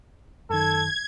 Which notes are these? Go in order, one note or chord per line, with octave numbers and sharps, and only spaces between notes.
F#2 D#3 A4 G#6